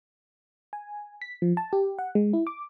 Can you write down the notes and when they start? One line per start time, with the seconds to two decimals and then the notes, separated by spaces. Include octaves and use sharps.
0.73 G#5
1.22 B6
1.42 F3
1.57 A5
1.73 G4
1.99 F#5
2.15 G#3
2.33 E4
2.47 D6